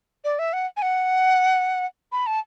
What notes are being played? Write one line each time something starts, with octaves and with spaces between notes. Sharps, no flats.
D5
E5
F#5
G#5
F#5
B5
A5